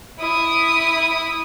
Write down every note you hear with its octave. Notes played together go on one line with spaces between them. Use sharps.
E4 D#6